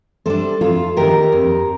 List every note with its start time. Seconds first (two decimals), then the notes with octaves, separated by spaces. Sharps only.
0.26 G3 D4 A4 C5
0.61 F2 F4 A4
0.97 D#3 A#3 D4 G4 A#4
1.32 F2